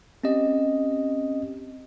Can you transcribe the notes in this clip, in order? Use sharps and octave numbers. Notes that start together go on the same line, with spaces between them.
C4 C#4 G4 D#5